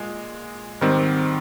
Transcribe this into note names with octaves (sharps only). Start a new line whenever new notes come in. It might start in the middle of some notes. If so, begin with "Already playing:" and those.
Already playing: A#2 G#3
G#2 D#3 G3 C4